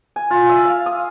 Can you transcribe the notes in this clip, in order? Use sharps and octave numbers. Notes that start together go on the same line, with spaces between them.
G#5
F4
E5
F5
D#6